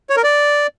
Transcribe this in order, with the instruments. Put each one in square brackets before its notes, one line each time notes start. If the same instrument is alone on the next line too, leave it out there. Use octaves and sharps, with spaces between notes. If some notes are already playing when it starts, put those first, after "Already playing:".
[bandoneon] C#5
A#4
D5